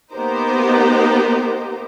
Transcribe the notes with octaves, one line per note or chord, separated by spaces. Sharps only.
A#3 B3 D#4 G4 A#4 C5